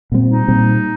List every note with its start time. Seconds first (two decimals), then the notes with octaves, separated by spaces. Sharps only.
0.12 A#2 G3 C4
0.29 D#4
0.48 A#2 G3 C4